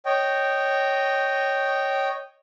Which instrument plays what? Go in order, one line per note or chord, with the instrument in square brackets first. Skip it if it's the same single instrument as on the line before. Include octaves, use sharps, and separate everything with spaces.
[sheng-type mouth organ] C#5 D#5 G5